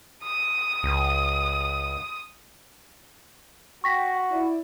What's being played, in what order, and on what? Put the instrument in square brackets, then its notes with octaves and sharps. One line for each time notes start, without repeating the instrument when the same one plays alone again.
[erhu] D#6
[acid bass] C#2
[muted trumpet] F#4 [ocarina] G5 [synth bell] C#6 A#6 B6
[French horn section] E4 [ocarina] D5